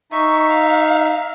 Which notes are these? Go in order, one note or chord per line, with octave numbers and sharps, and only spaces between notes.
D#4 E5 C#6
F5